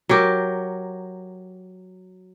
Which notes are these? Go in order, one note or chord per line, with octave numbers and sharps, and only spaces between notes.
F#3 G4 A#4